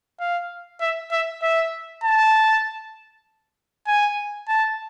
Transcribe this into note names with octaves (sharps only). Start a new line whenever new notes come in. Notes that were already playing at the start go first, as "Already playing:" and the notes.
F5
E5
E5
E5
A5
G#5
A5